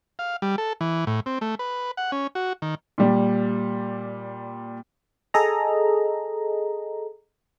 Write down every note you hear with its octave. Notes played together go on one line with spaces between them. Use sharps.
F5
G3
A4
E3
A2
C4
A3
B4
F#5
C#4
F#4
D#3
A#2 G3
G#4 A4 D#5 A#5